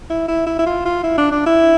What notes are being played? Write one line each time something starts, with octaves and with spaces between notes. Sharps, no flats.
E4
E4
E4
E4
F4
F4
E4
D4
D4
E4